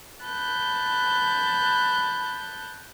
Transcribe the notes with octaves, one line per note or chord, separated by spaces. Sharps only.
A5 B5 F#6 G6